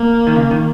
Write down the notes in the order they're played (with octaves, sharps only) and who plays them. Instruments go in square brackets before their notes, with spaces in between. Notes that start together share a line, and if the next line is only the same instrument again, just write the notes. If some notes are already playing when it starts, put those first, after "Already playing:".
Already playing: [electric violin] A#3
[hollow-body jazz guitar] D#3
C#3
D#3